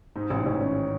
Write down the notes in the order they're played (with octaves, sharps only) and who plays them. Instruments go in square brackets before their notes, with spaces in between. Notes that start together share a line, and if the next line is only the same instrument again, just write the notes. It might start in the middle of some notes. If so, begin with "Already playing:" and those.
[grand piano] G#2 D#4
A1 D#4
A1 C#4
D#3 C#4